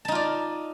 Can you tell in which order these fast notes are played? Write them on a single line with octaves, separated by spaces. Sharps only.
A5 D#4 F4 D5